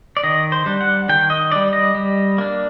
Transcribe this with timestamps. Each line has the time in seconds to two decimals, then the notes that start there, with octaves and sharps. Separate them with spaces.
0.17 D5
0.23 D#3 D#5
0.52 C5
0.66 G3 D4
0.81 F#5
1.09 D#3 G5
1.30 D#5
1.52 G3 D4 D5
1.73 D#5
1.95 G3
2.38 A#3 D4